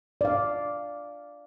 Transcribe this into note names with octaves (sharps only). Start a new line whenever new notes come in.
D5 F5